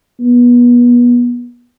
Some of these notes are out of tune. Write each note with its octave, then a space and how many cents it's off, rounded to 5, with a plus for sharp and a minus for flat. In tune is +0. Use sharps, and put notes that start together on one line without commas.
B3 -30